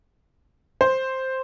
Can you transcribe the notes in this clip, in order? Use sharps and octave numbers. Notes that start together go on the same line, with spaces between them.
C5